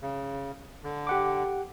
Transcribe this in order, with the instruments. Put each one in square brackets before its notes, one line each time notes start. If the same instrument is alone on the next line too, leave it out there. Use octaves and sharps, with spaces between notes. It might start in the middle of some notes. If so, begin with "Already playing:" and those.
[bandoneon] C#3
D3
[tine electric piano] G4 F#5 D6